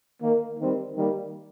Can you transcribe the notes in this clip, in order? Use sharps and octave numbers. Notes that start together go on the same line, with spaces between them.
D#3 A#3
D#3 G3 C4
D#3 G3 A#3